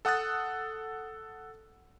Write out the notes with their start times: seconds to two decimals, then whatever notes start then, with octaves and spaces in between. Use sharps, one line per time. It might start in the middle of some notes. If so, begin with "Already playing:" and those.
0.05 A4 F#5 D#6 F#6 A6